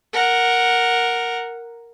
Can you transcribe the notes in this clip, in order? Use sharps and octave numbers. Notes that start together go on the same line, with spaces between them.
A#4 F#5